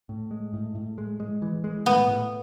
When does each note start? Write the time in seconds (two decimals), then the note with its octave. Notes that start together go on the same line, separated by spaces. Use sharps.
0.09 A2
0.31 G#3
0.53 A2
0.75 A2
0.98 G#3
1.20 G#3
1.42 E3
1.64 G#3
1.86 A2 B3
2.08 A2